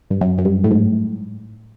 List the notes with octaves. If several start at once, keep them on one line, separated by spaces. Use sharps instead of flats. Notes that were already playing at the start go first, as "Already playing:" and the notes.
G2
F#2
F#2
G2
A2
G#2